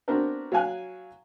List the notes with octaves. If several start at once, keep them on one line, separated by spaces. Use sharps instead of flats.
B3 C4 D4 F#4 A#4 B4
F#3 F5 G#5 F#6